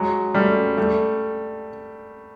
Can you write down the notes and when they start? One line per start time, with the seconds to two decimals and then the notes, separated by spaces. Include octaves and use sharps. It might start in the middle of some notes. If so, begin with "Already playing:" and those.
Already playing: F#3 G#3
0.35 G3 A3
0.78 G3 A3